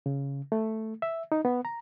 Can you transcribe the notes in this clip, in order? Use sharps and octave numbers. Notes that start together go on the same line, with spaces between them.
C#3
A3
E5
D#4
B3
A#5